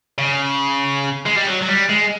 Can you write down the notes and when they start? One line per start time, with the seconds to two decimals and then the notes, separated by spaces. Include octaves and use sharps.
0.18 C#3
1.26 G#3
1.36 G3
1.47 F#3
1.61 F#3
1.68 G3
1.89 G#3